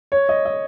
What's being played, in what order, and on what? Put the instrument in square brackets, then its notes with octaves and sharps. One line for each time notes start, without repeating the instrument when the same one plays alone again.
[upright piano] C#5
D#5
D#5